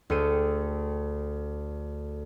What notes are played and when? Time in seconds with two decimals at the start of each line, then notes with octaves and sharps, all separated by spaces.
0.10 D2 G#4 A4 G5 C#7 D#7